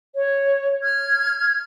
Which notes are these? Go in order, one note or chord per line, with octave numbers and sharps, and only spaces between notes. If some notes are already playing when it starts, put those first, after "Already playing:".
C#5
F6 G#6